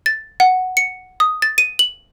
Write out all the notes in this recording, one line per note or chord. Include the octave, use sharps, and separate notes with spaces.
A6
F#5
C#7
D#6
A6
D#7
F#7